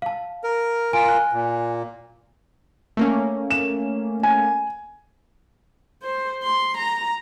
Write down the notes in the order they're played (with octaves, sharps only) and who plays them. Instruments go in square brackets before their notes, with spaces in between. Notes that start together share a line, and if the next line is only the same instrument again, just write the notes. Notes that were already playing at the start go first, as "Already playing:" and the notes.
[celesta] F5 A5
[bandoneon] A#4
[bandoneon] F4 A#4 [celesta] G#5 D7
[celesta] G#5 F#6
[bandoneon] A#2
[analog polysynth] A3 A#3 C#4
[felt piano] E7
G#5
[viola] C5
C6
A#5